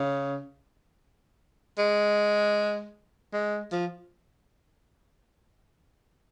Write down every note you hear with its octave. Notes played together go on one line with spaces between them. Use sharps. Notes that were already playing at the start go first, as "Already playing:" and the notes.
Already playing: C#3
G#3
G#3
F3